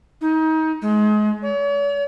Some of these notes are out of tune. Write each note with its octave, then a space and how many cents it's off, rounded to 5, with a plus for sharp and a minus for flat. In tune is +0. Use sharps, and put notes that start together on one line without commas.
D#4 +30
G#3 +30
C#5 +45